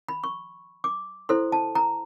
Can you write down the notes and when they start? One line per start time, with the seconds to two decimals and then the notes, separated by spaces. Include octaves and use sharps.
0.09 B5
0.24 C#6
0.84 D6
1.29 E4 A4 C5 C6
1.52 A5
1.75 A#5